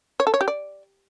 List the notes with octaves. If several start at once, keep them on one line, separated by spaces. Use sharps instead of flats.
C#5
A4
C#5
G4
D5